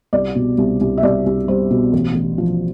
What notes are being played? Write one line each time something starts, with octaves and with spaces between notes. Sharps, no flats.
C2 D5
B2
C2
C2
E5
C2 D5
C2
G3 C5
B2
A1
A1
F3